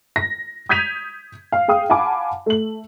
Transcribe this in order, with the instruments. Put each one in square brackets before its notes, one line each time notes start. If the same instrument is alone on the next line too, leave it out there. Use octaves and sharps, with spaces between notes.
[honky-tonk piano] A#6
D#6 G6 G#6 B6 D#7 F7
F5
G#4 F5 G5 D#6
F5 F#5 G#5 A5 B5 D6
A3 F#7